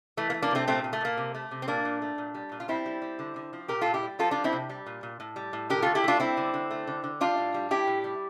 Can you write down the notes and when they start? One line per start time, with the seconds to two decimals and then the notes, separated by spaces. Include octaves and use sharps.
0.17 E3 A3
0.30 A#3
0.34 A3
0.42 A#3 D4
0.51 C3 A3 C4
0.67 A#2 A3 C4
0.84 A#2
0.93 A3
1.01 A#2 A#3
1.17 C3
1.35 A3
1.51 C3
1.62 C4
1.68 A#2 A#3 D4
1.85 A#2
2.02 A3
2.18 A#2
2.35 G3
2.52 A#2
2.60 F4
2.68 G3 C4 E4
2.86 G3
3.02 G3
3.19 D3
3.36 D3
3.53 F3
3.68 A#2 G4 A#4
3.81 A#2 F4 A4
3.94 E4 G4
4.03 G3
4.19 F3 F4 A4
4.31 F3 D4 F4
4.44 C4 E4
4.53 C3
4.69 G3
4.86 A#2
5.03 A#2
5.20 A2
5.36 G3
5.53 A2
5.70 D3 G4 A#4
5.82 A3 F4 A4
5.95 E4 G4
6.04 A3 D4 F4
6.20 G3 C4 E4
6.37 D3
6.54 D3
6.71 A3
6.87 D3
7.04 D3
7.20 G3 D4 F4
7.38 A2
7.54 G3
7.71 G3 E4 G4
7.87 A2
8.04 G3